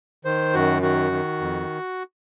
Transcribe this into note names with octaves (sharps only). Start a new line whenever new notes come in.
D#3 C5
F#2 F#4
D#3 F#4
D#3
F2